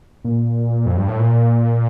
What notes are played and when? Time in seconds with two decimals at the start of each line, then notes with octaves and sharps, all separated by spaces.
0.24 A#2
0.86 F2
0.97 G2
1.08 A2
1.19 A#2